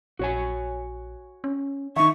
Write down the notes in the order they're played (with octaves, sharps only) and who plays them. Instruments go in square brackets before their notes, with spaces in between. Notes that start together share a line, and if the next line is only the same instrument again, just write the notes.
[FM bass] A#1 [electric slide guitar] F#4 C#5 G#5
[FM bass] C#4
[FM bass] D#3 [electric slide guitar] D#4 E5 [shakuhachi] C#6